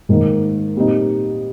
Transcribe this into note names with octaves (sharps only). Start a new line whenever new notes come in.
G#2 D#3 A#3 D#4
A#2 G3 C4 D#4